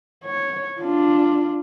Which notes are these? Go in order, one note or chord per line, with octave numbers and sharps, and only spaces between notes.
C#5
D4 F4